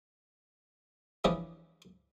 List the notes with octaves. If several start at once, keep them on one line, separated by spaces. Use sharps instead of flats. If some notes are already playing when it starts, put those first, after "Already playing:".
E3 F3 C#4 D4 E4 G#4